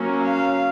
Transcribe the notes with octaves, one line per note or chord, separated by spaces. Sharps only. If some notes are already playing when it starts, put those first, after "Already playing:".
Already playing: F#3 A#3 C#4
F5